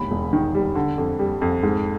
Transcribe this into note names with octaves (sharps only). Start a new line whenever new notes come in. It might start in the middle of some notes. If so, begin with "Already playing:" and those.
Already playing: E1 D#2 B5
E1
D#3
G3
D3
F2
G3
F2
G#2